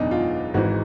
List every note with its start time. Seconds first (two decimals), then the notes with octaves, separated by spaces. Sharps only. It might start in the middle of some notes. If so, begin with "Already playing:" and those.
Already playing: F#1 E2 B2 D4 D#4
0.11 F4
0.54 G#1 G#2 E3 F#4